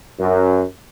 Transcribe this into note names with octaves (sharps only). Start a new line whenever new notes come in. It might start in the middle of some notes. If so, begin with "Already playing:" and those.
F#2